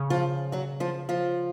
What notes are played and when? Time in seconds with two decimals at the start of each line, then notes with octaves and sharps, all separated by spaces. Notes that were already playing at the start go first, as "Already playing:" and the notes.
Already playing: C#3
0.10 F3 F4
0.52 F#3 F#4
0.80 F3 F4
1.09 F3 F4